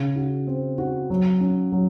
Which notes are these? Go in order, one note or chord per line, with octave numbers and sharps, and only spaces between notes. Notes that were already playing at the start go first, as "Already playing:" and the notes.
Already playing: C#3
F#4
C4
F#4
F#3
C#4
F#3